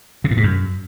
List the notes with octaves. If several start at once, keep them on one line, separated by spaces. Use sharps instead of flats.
C3
A2
G#2
F#2